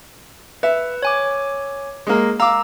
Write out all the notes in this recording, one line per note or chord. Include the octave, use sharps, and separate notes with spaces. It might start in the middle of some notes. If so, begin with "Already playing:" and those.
B4 E5
C#5 G#5 D6
G#3 A#3
F5 A#5 D6 E6